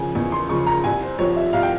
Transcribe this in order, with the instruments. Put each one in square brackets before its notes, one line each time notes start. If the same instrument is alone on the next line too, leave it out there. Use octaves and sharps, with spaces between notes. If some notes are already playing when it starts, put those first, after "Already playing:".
Already playing: [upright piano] C#3 F3 G#5
E2 G#5
C6
C#3 F3 C#6
A#5
C2 G#5
C5
C3 F3 C#5
E5
C2 F5
G5